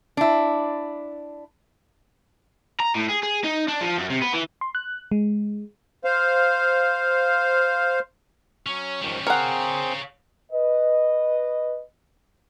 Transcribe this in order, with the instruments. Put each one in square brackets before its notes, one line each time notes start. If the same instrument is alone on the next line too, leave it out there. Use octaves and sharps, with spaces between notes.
[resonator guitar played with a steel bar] D4 E4
[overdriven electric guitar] A#5
A2
G#4
G#4
D#4
D4
F3
F#2
C3
B3
E3
[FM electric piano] C6
F#6
G#3
[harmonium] C5 F5
[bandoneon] F#3 C#5 [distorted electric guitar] C#4
[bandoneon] G#2 D#3 F3 [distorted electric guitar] G3 C#4
[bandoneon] C4 G#4 C5 [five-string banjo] A#4 F#5 [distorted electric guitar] C#5 F5
[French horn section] B4 D#5